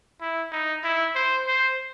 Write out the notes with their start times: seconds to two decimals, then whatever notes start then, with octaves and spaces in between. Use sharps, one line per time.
0.21 E4
0.52 D#4
0.84 E4
1.15 C5
1.47 C5